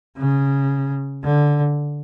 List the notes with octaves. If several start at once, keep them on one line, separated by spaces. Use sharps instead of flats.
C#3
D3